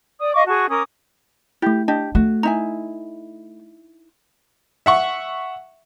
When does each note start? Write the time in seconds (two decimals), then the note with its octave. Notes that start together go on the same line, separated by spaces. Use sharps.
0.20 D5 D#6
0.34 D#5 F5 C#6 D6
0.46 F#4 G#4 A5 C#6
0.69 C#4 A#4 D6 D#6
1.62 A3 E4 G4
1.88 D4 G4 D#5 A5
2.15 A3 F#4
2.43 D#4 E4 G#5 A#5
4.86 E5 F#5 C#6